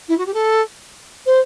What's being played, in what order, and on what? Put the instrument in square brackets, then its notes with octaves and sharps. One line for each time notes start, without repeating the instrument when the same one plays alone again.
[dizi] E4
F#4
G4
A4
C5